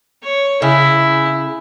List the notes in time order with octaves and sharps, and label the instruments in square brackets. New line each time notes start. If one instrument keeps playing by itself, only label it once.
[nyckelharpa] C#5
[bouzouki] C#3 [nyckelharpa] E4